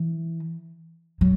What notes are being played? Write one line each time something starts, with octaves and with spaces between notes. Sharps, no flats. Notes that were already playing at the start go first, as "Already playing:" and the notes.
Already playing: E3
F#3